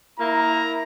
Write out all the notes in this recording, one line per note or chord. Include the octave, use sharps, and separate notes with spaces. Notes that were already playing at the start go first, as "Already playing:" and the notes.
A#3 E4 A#5